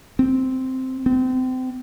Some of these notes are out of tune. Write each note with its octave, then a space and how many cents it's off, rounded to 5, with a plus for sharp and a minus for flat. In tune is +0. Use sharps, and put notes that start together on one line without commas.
C4 -5
C4 -30